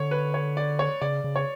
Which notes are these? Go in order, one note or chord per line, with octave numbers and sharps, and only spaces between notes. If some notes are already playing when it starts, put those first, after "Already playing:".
Already playing: D3 C#5
B4
C#5
D5
C#5
C#3 D5
C#3
C#5